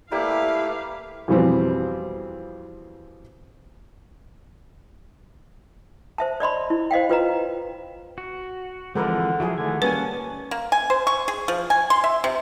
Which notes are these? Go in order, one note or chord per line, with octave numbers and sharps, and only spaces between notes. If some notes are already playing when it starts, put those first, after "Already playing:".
G3 A3 A#3 E4 G4 B4 F5
F2 B2 E3 G3 B3 C4
C5 E5 A5
D5 D#5 B5 C6
E4
C5 D#5 F5 G5
F4 B4 D#5 A#5
F#4
D3 E3 F3 G#3 C4 A#4 B4
F3 F#3 E4 G#4
D3 D#3 A3 G#5
G3 A#3 C#4 B4 F#5 G#5 A5
A#3
G#5
C5
C#6
G#4
F3
G#5
C6
E5
C3